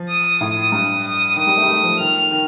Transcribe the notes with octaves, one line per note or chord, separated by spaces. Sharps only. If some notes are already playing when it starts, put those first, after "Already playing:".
Already playing: F3
D#6
A2 D#6
G2
D#6
D#3 D#6
G3
A3
G3
A3
F3
D#3 F6
D#3